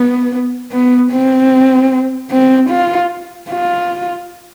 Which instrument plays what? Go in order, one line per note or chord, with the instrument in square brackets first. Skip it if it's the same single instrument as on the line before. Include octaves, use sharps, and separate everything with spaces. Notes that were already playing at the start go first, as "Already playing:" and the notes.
Already playing: [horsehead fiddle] B3
B3
C4
C4
F4
F4